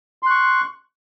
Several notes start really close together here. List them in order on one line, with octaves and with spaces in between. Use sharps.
C6 F#6 C#6